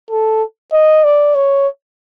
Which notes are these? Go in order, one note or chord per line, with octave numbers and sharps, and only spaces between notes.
A4
D#5
D5
C#5